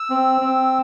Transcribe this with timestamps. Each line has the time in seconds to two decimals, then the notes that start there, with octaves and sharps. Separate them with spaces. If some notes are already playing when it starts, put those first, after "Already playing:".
Already playing: E6
0.10 C4
0.41 C4